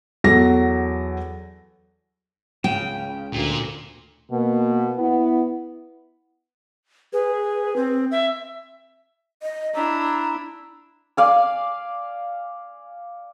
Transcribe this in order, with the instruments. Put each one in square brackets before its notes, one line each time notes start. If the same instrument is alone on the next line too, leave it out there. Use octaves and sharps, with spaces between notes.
[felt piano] E2 F#3 A4 A#6
[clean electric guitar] C#2 C#3 [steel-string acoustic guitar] G5
[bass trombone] D2 [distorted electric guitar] A#2
[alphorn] B2 [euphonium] A#3
[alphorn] B3 [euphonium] E4
[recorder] G#4 [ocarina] B4
[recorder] C4
E5
[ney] D#5
[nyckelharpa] D4 E4 [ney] A#5
[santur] D5 F5 G#5